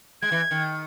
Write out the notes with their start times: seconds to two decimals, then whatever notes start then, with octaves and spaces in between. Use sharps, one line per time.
0.22 G#3 G#6
0.32 E3
0.51 D#3